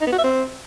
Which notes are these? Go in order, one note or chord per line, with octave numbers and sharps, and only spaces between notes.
D#4
B3
F#4
E5
C4